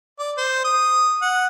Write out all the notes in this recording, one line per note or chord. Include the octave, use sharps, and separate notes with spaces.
D5
C5
D#6
F#5